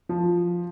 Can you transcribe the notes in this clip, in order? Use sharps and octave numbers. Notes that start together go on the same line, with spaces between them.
F3